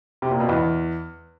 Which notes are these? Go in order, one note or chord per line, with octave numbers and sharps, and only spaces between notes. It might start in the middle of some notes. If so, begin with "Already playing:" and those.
C3
A#2
B2
E2